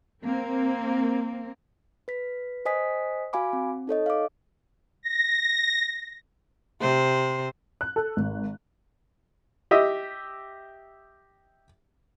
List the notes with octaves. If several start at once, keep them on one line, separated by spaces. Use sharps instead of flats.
A#3 C4
B4 B6
C5 D#5 G#5 D#6 B6
F#4 F5 G#5 B5 D6
C4
D#4 A4 C#5 D#5
F5 D6
A#6
C3 C5
F#6
A4
G#1
G4 D#5 E5